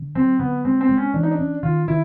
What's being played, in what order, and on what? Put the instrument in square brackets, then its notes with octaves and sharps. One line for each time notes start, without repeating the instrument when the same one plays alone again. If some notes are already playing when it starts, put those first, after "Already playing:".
Already playing: [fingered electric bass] D3
[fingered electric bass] F#3 [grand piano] C4
[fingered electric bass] D3 [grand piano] B3
[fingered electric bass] G#3 [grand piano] C4
[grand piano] C4
[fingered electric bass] G#3
[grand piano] C#4
[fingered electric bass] E3 [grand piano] D4
[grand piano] D#4
D4
[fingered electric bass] C#4
[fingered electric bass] D#3 [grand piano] F4
[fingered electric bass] D#3 [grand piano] E4